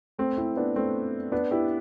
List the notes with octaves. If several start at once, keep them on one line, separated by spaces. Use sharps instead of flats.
A3 C4
C4 E4
B3 D4
A3 C4
B3 D4
E4 G4